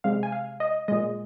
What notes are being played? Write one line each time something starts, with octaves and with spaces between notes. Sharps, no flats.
C3 G#3 F5
G#5
F5
D#5
A#2 G#3 D#5